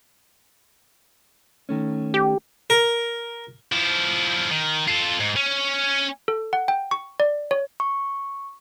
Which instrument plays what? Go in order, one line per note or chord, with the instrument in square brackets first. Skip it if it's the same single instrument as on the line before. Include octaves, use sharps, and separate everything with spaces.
[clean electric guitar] D#3 A3 C#4
[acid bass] G4
[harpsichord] A#4
[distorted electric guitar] F3 E4
D#3
F4 A4
G#2
C#4
[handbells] A4
F#5
G5
C#6
D5
C#5
[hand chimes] C#6